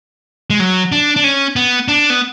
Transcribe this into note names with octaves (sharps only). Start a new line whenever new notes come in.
G#3
F#3
D4
D4
C#4
B3
D4
B3